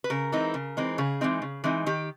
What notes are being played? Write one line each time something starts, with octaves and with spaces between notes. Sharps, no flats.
B4
C#3 A#4
E3 G#3 C4 D#4
C#3
E3 G#3 C4 D#4
C#3 G#4
E3 G#3 C4 D#4
C#3
E3 G#3 C4 D#4
D#3 G4